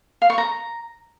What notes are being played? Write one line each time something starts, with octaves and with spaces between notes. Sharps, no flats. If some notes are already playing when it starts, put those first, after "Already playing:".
F5
C#6
A#5